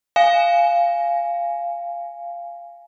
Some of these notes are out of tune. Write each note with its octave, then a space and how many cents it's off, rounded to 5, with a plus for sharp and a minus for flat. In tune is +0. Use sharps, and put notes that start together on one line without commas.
F5 -10 G#5 +0